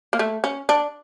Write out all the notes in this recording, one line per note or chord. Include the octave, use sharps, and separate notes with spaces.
A#3
A3
C#4
D4